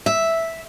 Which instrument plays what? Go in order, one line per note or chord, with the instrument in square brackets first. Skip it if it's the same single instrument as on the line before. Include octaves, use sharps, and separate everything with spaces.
[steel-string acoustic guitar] E5